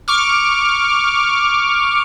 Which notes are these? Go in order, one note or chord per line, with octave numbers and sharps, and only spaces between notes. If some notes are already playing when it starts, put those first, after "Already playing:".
C#6 D6 F6